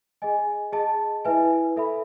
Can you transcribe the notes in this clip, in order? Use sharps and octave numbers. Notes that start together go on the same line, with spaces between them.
G#4 D#5 G#5
G#4 D#5 A5
E4 B4 E5 G#5
A4 E5 B5